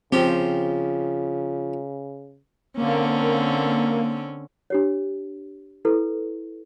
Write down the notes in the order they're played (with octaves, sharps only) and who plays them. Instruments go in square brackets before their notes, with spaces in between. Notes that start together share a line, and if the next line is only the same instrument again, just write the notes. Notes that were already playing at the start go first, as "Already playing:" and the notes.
[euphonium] C#3 [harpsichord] F3 G4 [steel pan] C4
[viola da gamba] D3 C4 C#4 [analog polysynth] A#3
[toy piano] D4 G4 C#5
E4 A4 B4